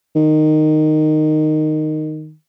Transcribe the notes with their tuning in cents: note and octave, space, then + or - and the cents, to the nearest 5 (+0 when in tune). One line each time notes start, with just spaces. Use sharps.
D#3 -10